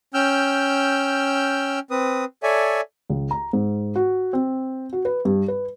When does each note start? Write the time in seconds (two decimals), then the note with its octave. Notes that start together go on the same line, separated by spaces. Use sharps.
0.14 C#4 G5 E6 F6 G6
1.91 C4 B4 D#6
2.43 A4 C#5 D5 E5 G#5
3.10 C#2
3.31 A#5
3.53 G#2
3.96 F#4
4.33 C4
4.93 F#4
5.05 B4
5.25 G2
5.48 B4